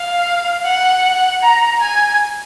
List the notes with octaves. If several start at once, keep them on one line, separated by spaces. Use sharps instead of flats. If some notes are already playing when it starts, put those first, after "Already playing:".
Already playing: F5
F#5
A#5
G#5